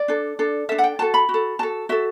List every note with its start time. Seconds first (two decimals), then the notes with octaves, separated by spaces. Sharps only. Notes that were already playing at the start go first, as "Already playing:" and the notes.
Already playing: D5
0.08 D4 A4
0.39 D4 A4
0.69 D4 A4 E5
0.78 F#5
0.84 G5
0.99 F#4 A4 A5
1.14 B5
1.29 F#4
1.34 A4
1.59 F#4 A4 A5
1.89 F#4 A4 E5